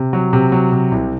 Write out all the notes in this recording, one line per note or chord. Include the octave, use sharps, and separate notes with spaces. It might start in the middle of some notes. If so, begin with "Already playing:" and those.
Already playing: C3
F#3
C3
F#3
C3
C2